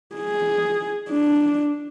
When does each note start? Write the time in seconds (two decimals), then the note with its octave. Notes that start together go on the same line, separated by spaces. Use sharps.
0.15 G#4
1.10 D4